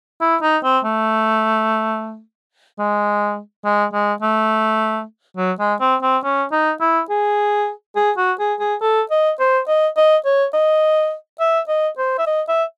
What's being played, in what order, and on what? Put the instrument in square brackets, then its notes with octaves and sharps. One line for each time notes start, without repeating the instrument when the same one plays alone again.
[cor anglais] E4
D#4
C4
A3
G#3
G#3
G#3
A3
F#3
G#3
C4
C4
C#4
D#4
E4
G#4
G#4
F#4
G#4
G#4
A4
D#5
C5
D#5
D#5
C#5
D#5
E5
D#5
C5
E5
D#5
E5